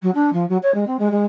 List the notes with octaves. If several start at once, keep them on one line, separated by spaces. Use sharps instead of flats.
F#3
D4
F3
F#3
C#5
G#3
C4
G#3
G#3